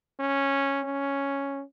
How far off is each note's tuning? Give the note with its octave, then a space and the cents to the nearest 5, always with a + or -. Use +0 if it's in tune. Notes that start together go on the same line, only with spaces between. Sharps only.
C#4 -5
C#4 +0